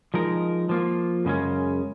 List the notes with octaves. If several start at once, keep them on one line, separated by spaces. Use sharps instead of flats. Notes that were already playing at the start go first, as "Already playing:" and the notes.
F3 G#3 D#4 A#4
F3 A#3 F4
F#2 C#3 G#3 C#4